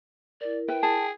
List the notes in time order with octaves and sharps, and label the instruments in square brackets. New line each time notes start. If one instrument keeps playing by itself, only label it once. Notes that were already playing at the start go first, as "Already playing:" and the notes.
[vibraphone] E4 A#4 [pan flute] D5
[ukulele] B4 E5 [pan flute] G5
[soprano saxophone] G#4 [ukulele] A5